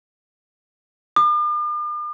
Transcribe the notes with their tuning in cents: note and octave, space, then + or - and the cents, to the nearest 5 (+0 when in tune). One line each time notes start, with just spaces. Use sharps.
D6 +45